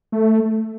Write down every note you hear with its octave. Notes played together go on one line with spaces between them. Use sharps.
A3